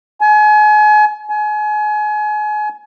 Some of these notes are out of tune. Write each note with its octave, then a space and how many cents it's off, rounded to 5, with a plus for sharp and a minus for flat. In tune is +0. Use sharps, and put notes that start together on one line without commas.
G#5 +35
G#5 +30